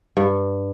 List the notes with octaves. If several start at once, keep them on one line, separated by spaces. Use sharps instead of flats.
G2